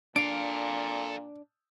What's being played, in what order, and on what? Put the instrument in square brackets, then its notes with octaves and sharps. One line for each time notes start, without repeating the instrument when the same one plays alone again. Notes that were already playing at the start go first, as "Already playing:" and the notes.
[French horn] A#2 [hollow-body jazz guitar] D4 [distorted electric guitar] A4 F5 [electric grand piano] D7